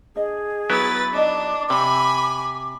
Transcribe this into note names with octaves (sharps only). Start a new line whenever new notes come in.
D4 G#4 D#5
F#3 B3 E4 B4 A6
D4 D#4 D5 D#5 D6
C3 D5 G#5 B5